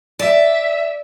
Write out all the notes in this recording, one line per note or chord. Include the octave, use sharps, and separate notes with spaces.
D5 E5